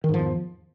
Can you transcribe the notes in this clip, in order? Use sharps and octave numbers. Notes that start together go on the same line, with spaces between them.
E2 G#2 D#3 F3